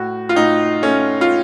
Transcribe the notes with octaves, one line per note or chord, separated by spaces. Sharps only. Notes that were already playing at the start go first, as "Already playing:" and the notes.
Already playing: A2 F#4
F4
A2 D#4
A3 C#4
F4